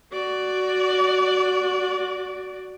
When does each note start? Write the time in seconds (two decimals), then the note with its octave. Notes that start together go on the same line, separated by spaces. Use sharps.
0.12 F#4 D5